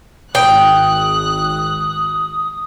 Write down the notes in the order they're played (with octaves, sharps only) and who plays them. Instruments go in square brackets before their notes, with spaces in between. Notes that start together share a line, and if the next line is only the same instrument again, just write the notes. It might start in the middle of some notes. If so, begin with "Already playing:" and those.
[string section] G#1 F#6 [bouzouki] G5 [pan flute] D#6